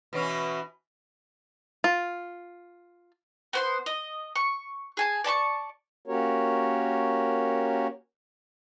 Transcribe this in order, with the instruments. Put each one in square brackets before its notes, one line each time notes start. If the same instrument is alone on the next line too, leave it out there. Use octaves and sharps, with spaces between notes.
[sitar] B2 E3 C#4
[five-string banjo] F4
[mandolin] B3 C5 C6
D#5
C#6
G#4 G#5 A5
D5 A5 B5 C#6
[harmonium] A#3 C#4 F#4 G4 A#4 C#5